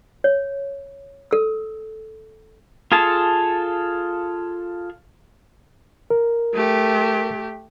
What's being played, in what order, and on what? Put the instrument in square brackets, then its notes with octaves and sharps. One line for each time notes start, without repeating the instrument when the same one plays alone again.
[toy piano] C#5
A4 E6
[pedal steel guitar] F4 G#4 A4 A5
[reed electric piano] A#4
[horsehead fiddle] A3 G4